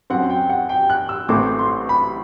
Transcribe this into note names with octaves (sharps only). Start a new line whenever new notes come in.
F#2 F#3 C4 F#5
G5
F#5
G5
F#6
E6
A1 A2 E3 A3 C4 D6
C6
B5